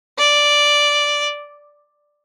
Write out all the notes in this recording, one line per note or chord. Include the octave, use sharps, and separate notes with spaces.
D5